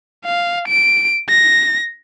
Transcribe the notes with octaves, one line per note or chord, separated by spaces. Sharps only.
F5
D7
A#6